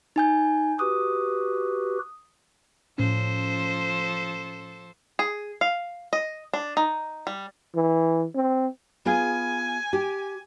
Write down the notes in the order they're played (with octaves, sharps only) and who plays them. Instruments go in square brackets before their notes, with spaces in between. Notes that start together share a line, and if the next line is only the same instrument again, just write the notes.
[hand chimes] D#4 G#5 G6
[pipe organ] F#4 G4 B4 [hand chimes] D#6
[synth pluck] A2 C#4 [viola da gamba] F3 A4 C5
[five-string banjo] G#4
F5
D#5
D4
D#4
G3
[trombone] E3
C4
[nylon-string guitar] B3 F4 G#4 [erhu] G#5
[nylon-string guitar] G4